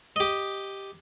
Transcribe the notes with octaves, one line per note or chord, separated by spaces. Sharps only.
G4 D#5